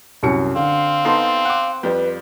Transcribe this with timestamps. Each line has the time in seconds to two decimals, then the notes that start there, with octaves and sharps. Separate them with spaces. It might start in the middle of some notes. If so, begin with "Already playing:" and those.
0.23 C2 F#2 C#7
0.55 D3 C4 F5
1.05 B3 D#4 A4 C6
1.45 F#5 D6
1.83 F2 G3 B4